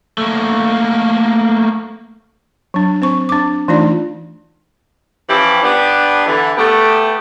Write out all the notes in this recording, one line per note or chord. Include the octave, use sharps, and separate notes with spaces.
A3 A#3
F#3 D4
C4 C5 C#6
D4 D6
E3 A3 D4 D#4 F4 D5
E3 F3 C#4 E4 G4
B3 D4 G4
D3 E3
A3 B3 G4